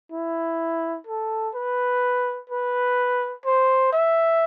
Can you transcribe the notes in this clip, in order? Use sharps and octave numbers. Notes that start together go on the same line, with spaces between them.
E4
A4
B4
B4
C5
E5